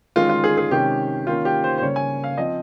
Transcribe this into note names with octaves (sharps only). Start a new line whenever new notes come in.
D#3 G#3 C#4 F4
F4
G#4
G#4
C3 D#3 G#3 C#4 G4
D#3 A#3 C#4 F4
G4
C5
C5
C#3 G3 A#3 C#4 C#5
G#5
F5
F3 C4 D#5